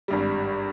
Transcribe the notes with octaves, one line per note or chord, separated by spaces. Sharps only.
G#1 G2 G3